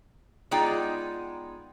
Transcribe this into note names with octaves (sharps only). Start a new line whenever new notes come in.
G#3 B3 D#4 F4 D5 G5